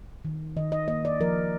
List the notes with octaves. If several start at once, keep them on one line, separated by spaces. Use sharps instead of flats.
D#3
D#3 D#5
D#5
A#3 D#5
D5
F3 A#4